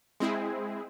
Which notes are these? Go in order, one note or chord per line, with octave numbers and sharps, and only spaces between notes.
G#3 C4 E4 G#4